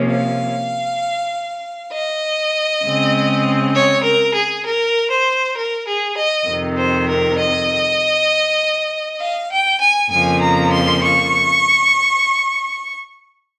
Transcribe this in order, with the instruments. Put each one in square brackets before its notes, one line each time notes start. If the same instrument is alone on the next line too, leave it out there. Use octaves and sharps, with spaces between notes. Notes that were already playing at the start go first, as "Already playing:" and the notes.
Already playing: [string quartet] C3 F3 A#3 C#4
F5
D#5
C#3 G#3 C4
C#5
A#4
G#4
A#4
C5
A#4
G#4
D#5
F2 C3 D#3
C5
A#4
D#5
F5
G5
G#5
F2 C#3 F3 A#3 G#5
A#5
C6
C#6